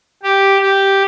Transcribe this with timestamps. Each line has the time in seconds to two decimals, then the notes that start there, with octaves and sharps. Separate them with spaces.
0.23 G4
0.61 G4